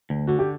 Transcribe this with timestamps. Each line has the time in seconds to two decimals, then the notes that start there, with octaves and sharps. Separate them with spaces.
0.10 D2
0.27 D3 F#4
0.39 G4